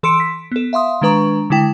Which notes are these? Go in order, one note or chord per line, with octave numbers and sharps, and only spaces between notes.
E3 A4 C6 E6 C#7 D7
B6
B3 A4
E5 F5 C6 D#6
D#3 G#3 D4 B4 A#5 C#6
D3 G#3 E4 G5